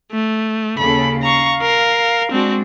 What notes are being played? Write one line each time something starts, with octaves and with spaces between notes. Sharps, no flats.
A3
D#2 C#3 A4 B5
F5 A#5 C#6
A#4
G#3 C4 D4 F#4